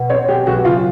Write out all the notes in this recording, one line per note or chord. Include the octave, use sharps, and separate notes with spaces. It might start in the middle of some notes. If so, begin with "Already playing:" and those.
Already playing: B2
C4 C#5
G#3 G4
B1 F#4
C#3 F4